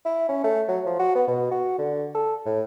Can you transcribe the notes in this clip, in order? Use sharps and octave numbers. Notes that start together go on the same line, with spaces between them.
E4
C#4
A3
F#3
F3
F#4
B3
B2
F#4
D3
A4
A2